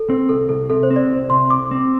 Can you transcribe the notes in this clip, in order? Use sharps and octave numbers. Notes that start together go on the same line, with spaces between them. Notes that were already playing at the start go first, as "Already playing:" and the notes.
Already playing: A4
C4
C2 A4
C2 A4
C3 A4
C5
C4
D5
C2
C3 C6
C2 D6
C4